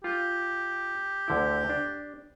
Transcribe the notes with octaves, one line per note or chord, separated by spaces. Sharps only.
F4 G4
D2 D3 E4
D4